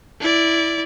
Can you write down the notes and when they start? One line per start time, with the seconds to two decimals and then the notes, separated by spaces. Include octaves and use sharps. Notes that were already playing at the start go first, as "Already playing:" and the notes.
0.21 E4 D5